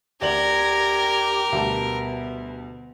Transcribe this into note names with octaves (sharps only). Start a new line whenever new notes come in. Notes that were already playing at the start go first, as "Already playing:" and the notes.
D2 G4 A#4 D5 G#6 A#6 F#7
D2 B2 G3 A5